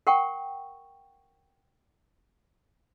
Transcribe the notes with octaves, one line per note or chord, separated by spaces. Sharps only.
A#4 F#5 G5 C#6